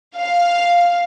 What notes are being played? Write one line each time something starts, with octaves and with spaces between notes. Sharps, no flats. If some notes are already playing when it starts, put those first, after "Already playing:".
F5